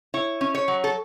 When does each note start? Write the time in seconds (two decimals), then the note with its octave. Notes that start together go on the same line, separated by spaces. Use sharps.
0.14 E4 C#5
0.41 C#4
0.55 C#5
0.68 F#3
0.84 A4